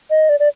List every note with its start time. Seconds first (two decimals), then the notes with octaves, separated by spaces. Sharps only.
0.10 D#5
0.29 D5
0.40 D5